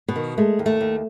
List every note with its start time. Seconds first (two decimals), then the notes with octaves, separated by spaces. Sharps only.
0.08 B2 B3
0.16 D#3
0.37 G#3 A3
0.59 D#2
0.66 A3
0.81 D#2